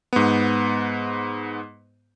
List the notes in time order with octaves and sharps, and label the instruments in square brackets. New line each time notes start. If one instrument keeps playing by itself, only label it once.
[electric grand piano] G#2 B3